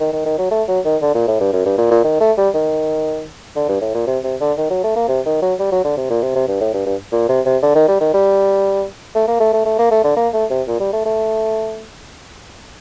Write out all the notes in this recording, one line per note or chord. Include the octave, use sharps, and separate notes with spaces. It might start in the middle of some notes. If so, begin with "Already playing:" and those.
D#3
D#3
D#3
F#3
A3
F#3
D#3
D3
A#2
A2
G2
F#2
G2
A#2
A#2
D#3
A3
G3
D#3
D3
G2
A2
A#2
C3
C3
D3
D#3
F#3
A3
A#3
C3
D#3
F#3
G3
F#3
D3
C3
A#2
C3
C3
G2
A2
G2
G2
A#2
C3
C3
D3
D#3
G3
D#3
G3
A3
A#3
A3
A3
A3
A#3
A3
D3
A#3
A3
C3
A#2
G3
A3
A3